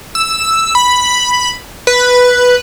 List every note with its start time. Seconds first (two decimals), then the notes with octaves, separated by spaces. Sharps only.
0.15 E6
0.75 B5
1.87 B4